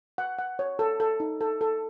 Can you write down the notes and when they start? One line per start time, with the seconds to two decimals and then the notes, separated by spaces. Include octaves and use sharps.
0.18 F#5
0.39 F#5
0.59 C#5
0.79 A4
1.00 A4
1.20 D#4
1.41 A4
1.61 A4